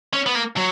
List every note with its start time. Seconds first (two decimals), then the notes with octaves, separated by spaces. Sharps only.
0.13 C#4
0.26 B3
0.35 A#3
0.57 F#3